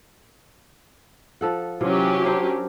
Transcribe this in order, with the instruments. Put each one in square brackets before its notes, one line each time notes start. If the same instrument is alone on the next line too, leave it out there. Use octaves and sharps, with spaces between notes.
[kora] F3 A4 F#5
[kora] C3 E3 F4 [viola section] F#3 C#4 G4
[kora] D4 A#4 C5